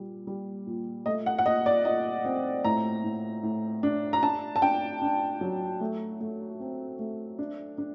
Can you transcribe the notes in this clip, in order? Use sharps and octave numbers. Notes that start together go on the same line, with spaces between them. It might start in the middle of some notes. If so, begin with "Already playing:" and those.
Already playing: A#2 G3
G3
A#2
A3 D#5
F#5
F#5
A#2 D#5
D5
A#2 D#5
C4
A2 A#5
A2
A2
D4
A#5
D4 A5
A5
D4 G5
D4
F#3
A3
A3
C4
A3
D4
D4